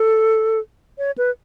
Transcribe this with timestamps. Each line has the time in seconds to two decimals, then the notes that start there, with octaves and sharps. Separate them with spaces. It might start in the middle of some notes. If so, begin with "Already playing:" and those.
Already playing: A4
0.98 C#5
1.18 B4